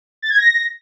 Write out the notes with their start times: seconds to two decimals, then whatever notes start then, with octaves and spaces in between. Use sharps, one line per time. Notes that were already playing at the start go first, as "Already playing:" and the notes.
0.22 A6
0.30 G#6
0.38 A#6